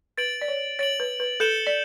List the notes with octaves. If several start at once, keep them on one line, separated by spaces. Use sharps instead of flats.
B4 A6 D7 F#7
D5
C#5
C#5 A6 D7 F#7
B4
B4
A4 G6 C#7 E7 G7
D5